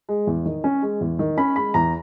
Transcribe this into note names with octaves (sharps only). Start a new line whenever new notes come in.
G#3
E2
D#3
C#4
G#3
E2
D#3
C#4 B5
G#3 B5
E2 A#5